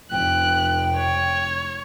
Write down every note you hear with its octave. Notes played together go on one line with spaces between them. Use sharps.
F1 G5 F#6
C#5